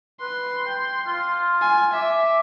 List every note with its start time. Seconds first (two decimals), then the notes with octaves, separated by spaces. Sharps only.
0.21 B4 C6
0.66 G5
1.06 F4
1.61 G#5
1.94 E5 D6